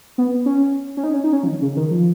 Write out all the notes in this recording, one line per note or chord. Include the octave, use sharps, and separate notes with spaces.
B3
C#4
C#4
D#4
C#4
D#4
C#4
F3
D#3
C#3
D#3
F3